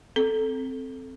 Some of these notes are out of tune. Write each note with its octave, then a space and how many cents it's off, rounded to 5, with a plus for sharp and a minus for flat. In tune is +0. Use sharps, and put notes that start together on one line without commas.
C4 +0 A4 +0